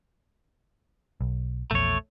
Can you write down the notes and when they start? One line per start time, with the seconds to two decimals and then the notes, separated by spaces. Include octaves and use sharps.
1.21 B1
1.71 A#1 E2 A3 C#5